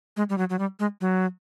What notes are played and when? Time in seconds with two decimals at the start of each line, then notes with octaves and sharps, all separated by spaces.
0.17 G#3
0.30 G3
0.38 F#3
0.50 F#3
0.59 G3
0.80 G#3
1.01 F#3